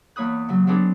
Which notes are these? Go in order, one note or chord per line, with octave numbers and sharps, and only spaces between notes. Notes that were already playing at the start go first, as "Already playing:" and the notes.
E2 A#3 C#5 B5 D#6 F#6
C#3 F#3
F#3 B3 C4 D4 G#4 B4